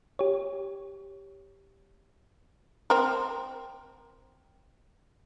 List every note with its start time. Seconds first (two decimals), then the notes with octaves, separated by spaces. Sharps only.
0.19 G4 C#5
2.90 C4 A#4